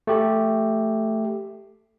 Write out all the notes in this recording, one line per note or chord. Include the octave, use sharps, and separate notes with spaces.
A3 G4